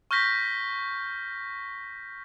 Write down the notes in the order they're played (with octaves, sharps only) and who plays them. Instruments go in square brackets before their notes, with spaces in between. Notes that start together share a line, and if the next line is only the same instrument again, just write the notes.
[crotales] C#6 F6 G6 A#6 B6